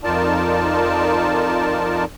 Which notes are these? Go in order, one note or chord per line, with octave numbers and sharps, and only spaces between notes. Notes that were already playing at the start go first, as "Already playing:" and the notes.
F2 D#4 F4 A#4 D5 A5